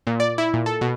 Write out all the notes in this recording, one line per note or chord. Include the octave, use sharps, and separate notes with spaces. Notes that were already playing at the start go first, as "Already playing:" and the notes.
A#2
D5
E4
A#2
A4
B2